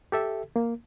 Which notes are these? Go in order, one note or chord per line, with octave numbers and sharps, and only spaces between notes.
G4 A4 E5
A#3